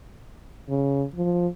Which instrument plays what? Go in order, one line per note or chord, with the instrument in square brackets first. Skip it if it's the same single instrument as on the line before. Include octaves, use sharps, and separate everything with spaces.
[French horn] C#3
F3